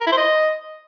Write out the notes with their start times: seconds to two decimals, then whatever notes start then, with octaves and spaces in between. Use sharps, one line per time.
0.01 A#4
0.07 E4
0.12 C5
0.17 D#5